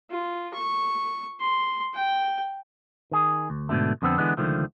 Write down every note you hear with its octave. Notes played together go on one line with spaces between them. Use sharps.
F4
C#6
C6
G5
D#3 G#4
D2
G#2 B2 D3 A3
F2 D3 B3 C4 A4
D3 E3 G#3 B3 D4
C#2 D3 D#3 F3 A3